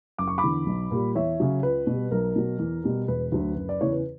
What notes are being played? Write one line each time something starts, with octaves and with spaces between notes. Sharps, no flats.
F#1 D6
C#6
B5 D6
E2 D3
B1
A#2 G3
E2 C#5 E5
C#3 F#3
C#2 B4
B2
G3
B1 A#4
B2 F#3
E2
B2 G3
E1 B4
D2 D3 F#3
F#1
D5
E2 C#3 E3 C#5
B4